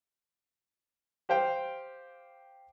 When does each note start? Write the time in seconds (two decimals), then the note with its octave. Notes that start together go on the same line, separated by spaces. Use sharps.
1.29 G4 C5 F5 G5